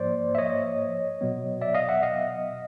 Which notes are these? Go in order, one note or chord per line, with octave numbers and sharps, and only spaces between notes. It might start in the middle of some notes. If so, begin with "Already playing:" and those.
Already playing: G#2 F3 A#3 C5 D5
E5
C#5 D#5
B2 F#3 B3
D5 E5
D#5 F5
E5 F#5
D#5 F5